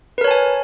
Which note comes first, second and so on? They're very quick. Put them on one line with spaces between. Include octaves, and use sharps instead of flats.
B4 A#4 C#5 A5 G#5